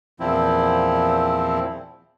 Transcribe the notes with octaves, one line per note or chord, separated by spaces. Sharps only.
E2 A#2 F3 C4 E4